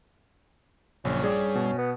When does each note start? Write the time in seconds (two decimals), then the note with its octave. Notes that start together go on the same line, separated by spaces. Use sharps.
1.05 A#1 F#2 C#3 C#4
1.23 G2 G#4 D5
1.55 B2
1.78 B3